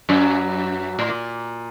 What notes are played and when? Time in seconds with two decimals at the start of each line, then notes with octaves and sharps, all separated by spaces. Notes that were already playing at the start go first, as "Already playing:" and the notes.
0.09 F#2 F#3
0.99 A2
1.09 A#2